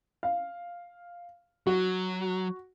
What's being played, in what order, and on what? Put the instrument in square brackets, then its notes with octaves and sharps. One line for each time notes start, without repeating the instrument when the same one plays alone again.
[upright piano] F5
[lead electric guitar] F#3 [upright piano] F#4